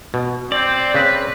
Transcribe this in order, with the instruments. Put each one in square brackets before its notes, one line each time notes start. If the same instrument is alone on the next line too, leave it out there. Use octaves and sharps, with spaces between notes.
[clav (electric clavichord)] B2
[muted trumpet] C4 [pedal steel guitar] D5
[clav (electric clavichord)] C#3 C4 [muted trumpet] B4